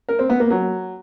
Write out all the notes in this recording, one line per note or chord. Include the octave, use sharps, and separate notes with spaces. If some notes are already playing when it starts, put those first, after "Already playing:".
A#4
C4
B3
A#3
F#3